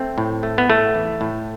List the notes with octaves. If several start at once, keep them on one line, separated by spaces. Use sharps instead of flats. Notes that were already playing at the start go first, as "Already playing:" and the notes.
Already playing: A3 C4
A2
A3
B3
A2 A3
E3
A2